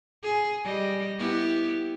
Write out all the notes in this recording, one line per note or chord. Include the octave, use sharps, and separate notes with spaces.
G#4
G3 D#5
B3 E4 G4